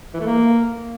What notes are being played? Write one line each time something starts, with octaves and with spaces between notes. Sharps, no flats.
E3
A3
A#3